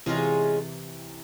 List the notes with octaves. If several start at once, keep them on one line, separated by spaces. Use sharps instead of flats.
C3 E3 G#3 C#4 F4 G#4